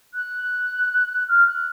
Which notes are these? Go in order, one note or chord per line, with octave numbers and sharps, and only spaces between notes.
F#6
F6
F#6